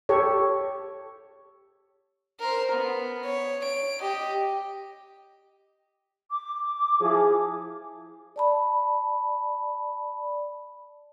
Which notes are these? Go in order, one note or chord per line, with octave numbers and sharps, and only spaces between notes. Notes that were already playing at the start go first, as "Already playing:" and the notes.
G4 A4 C#5
A#4 C5
B3
C#5
D7
G4 D#5
D6
F3 E4 G#4
D5 A5 B5